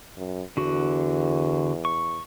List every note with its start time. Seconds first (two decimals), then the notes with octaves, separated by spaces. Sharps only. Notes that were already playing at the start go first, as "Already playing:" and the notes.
0.17 F#2
0.57 E2 D3 F#4
1.85 C#6